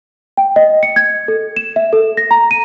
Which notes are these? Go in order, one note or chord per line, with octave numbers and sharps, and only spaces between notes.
G5
D#5
C#7
G#6
A4
E7
E5
A4
A#6
A#5
D#7